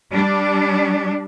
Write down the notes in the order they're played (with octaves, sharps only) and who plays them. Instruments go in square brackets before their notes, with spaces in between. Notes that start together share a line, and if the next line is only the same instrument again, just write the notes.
[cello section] G3 D4